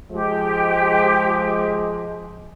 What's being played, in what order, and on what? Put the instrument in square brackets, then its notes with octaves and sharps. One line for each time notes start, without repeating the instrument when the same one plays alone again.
[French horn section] F3 G#3 [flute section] G4